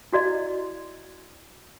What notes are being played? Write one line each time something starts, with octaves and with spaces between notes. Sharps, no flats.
E4 F#4 D5 D#5